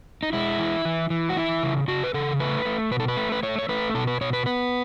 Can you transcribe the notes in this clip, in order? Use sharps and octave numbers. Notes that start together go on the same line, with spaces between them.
D#4
G#3 E4
E3
E3
E3
F#4
E3 E4
C#3
C#3 F#4
B4
C#3 A4
A3 B4
A3
B2 B4
A4
B4
A3
B4
A3 C#5
C#5
A3 B4
B2 A4
B4
B2 C#5
B4
B3 B4